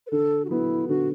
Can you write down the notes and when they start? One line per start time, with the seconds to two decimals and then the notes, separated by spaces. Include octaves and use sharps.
0.07 B4
0.11 D3 A4
0.45 F#4
0.49 F#3 B3 E4
0.88 D3 F#4